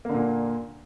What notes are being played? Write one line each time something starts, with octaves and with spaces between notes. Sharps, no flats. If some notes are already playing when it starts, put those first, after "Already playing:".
A#2 D3 A#3